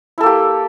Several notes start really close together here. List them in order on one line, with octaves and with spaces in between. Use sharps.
E4 A4 A#3 G4